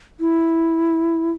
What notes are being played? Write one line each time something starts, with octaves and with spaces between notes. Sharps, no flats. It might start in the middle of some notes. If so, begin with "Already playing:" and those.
E4